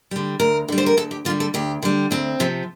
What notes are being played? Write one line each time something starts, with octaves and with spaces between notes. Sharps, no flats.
D3 G3
D2 A#4
D3 G3
C5
A#4
D2 A4
G4
D3 G3 F4
A4
D2 G4
D3 G3
D2 C4
C3 F3